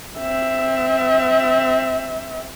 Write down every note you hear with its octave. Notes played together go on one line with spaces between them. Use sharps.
C4 E5